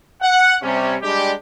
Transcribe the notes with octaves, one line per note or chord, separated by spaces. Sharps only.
F#5
C3 G3 C#4
G3 G#3 D4 G4